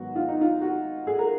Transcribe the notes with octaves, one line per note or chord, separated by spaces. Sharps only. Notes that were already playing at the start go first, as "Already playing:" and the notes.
Already playing: G#2 D#3 F#3 B3 F#4
F4
D#4
F4
F#4
G#4
A#4